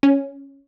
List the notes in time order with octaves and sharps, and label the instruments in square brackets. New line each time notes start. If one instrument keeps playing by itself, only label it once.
[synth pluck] C#4